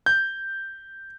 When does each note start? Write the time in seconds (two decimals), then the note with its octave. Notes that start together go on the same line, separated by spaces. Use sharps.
0.06 G6